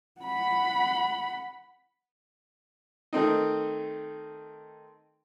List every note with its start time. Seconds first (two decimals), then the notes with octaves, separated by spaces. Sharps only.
0.21 F#5 B5
3.13 D#3 A3 C4 D#4